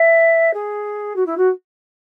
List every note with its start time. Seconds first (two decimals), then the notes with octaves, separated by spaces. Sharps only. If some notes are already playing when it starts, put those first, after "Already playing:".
Already playing: E5
0.54 G#4
1.16 F#4
1.26 E4
1.37 F#4